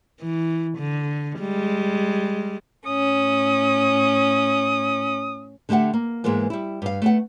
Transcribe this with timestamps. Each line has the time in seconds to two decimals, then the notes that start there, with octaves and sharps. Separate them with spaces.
0.21 E3
0.78 D3
1.40 G3 G#3
2.86 A2 C#4 D#6
5.69 D3 A3 G4 E5 F#5
5.93 A#3
6.24 G#2 E3 G#3 A#3 B3
6.50 G3 E4
6.82 G2 F5
7.02 A3 B3 F#5